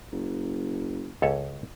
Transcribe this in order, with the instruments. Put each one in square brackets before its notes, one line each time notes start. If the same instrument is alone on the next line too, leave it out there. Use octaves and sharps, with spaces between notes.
[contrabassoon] F#1
[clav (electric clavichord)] C#2 A4 C#5